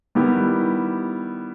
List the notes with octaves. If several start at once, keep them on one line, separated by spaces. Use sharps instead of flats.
D#3 G3 B3 E4 G4